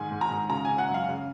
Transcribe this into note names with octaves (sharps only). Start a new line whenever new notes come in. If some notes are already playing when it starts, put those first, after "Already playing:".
Already playing: G#2 D#3 G#5
G#2
A#5
G#2
C#3 A#5
C#3 G#5
F#5
F#2
F5
C#3